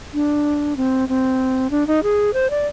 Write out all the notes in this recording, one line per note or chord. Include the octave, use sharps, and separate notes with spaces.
D4
C4
C4
D4
D#4
G#4
C5
D5